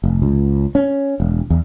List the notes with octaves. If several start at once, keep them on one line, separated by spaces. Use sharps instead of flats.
F1
C#2
C#4
E1
E2